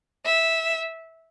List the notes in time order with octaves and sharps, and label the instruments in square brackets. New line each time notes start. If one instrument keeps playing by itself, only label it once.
[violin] E5